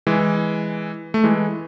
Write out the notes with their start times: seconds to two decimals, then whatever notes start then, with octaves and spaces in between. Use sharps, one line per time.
0.07 E3 G#3
1.14 A3
1.24 E3 G#3